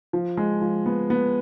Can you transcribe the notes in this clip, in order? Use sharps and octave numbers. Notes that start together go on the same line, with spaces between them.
F3
G#3
F3
B3
B3